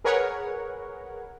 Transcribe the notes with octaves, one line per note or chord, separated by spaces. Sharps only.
G#4 A#4 B4 C#5 F#5